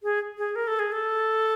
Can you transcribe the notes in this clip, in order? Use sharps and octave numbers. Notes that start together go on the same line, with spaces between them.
G#4
G#4
A#4
A4
G#4
A4